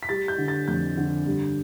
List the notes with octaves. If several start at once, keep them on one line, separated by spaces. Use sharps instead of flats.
B6
G3 A6
G6
D3
A6
F2 G6
D3
G2